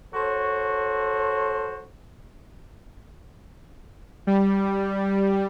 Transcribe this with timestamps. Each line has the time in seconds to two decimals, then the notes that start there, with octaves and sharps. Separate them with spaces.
0.14 F#4 A4 C5 C#5
4.27 G3